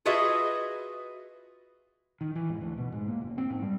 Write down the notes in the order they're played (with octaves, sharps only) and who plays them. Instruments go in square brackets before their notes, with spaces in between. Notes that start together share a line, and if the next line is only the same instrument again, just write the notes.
[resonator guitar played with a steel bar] F4 F#4 G#4 B4 D#5 E5
[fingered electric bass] D#3
E3
G#2
D2
B2
G#2
A#3
F#1
C4
G#2
G3